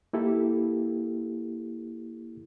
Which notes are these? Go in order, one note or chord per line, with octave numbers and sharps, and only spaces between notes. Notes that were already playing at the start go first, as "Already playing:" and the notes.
A#3 E4 G4 A4